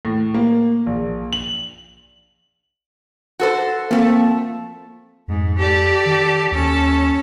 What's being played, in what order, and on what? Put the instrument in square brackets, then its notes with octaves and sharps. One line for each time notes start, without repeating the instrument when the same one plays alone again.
[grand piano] A2
A#3
A#1
F#7
[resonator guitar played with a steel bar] F#4 A4 C5
[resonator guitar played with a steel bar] F3 A3 [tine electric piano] A#3 C4
[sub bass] F2 [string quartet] G#2
[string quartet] G4 A4 D5
[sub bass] D#3
[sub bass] D#2 [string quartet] C#4 A4